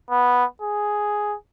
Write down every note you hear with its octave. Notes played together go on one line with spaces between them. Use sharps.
B3
G#4